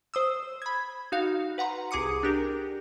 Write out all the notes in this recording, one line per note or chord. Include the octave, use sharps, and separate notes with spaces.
C5 D#6 E6
B5 G#6
D#4 F#4 F5
B4 F#5 A#5 C6
C2 G#4 D6 D#6 C#7
D4 G4 A#4